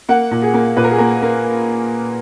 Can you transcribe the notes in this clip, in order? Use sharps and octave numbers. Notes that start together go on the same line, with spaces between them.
A#3 F#5
A#2
G#4
A#3
A#2 B4
A#4
G#4
A#3 A#4
A#3